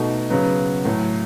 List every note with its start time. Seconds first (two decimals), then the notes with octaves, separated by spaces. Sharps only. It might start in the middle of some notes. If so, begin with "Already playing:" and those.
Already playing: B2 A3 D#4 F#4
0.30 C#3 F#3 B3
0.85 A2 F#3 A3